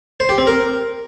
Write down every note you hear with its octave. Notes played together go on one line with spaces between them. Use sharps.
C5
G4
C4
A#4